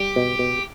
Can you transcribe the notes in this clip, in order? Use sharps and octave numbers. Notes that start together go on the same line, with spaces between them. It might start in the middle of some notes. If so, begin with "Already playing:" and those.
Already playing: G3 G4
B2
B2